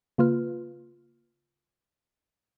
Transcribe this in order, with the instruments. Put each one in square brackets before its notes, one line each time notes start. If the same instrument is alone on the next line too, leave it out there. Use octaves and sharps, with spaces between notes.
[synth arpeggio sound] C#3 A#3 F4 B4 F6